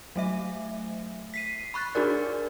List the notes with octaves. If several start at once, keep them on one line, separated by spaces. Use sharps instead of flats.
F#3 A3 E5
B6 C7 D#7
B5 C#6 F#6 A6
D4 D#4 F#4 G#4 A#4 D5